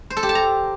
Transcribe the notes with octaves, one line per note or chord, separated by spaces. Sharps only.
C5
A4
G4
A5
A#5